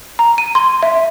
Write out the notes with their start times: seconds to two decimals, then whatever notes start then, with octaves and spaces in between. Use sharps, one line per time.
0.19 A#5
0.38 D#7
0.55 C6
0.83 E5